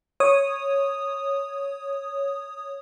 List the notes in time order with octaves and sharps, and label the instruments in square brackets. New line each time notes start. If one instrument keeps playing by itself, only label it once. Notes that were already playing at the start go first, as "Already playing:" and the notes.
[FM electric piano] C#5 D#6